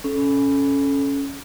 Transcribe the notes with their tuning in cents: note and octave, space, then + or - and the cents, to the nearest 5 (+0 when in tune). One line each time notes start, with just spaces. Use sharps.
C#4 +0 A4 -20